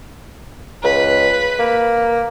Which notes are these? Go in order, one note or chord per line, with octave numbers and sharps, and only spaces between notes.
C#2 B4
A#3